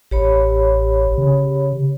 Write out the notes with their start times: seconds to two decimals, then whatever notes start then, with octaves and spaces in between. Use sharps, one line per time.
0.11 A1 G4 C#5 B5
1.18 C#3